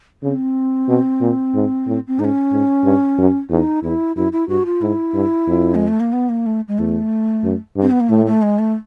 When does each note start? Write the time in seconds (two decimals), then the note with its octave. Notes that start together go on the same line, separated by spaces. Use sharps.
0.22 C#3 C4
0.88 B2
1.21 A#2
1.54 G#2
1.87 A2
2.07 C4
2.19 G#2 D#4
2.24 C#4
2.52 G#2
2.84 G2
3.18 F#2
3.50 E2 D#4
3.83 E2 E4
4.16 F#2 E4
4.32 E4
4.48 G2 F#4
4.65 F4
4.82 G#2 E4
5.14 G2
5.47 F2
5.75 G#3
5.88 A3
6.00 A#3
6.13 B3
6.29 A#3
6.46 A3
6.68 G#3
6.78 E2 A3
7.44 F#2
7.76 G2
7.82 C4
7.91 B3
8.00 A#3
8.09 A2 A3
8.26 A3
8.42 G#3
8.59 A3